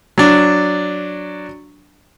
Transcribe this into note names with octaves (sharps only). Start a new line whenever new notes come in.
F#3 D4